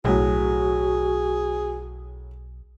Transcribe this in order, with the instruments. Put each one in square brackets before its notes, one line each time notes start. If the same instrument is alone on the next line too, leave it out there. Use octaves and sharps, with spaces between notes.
[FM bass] B1 [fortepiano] A2 F#3 [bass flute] F#4 [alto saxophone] G#4